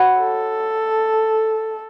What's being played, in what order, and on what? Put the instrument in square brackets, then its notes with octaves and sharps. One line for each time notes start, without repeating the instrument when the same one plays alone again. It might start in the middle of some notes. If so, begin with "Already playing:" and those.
Already playing: [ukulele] F#4 C#5 F#5 B5
[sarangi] A4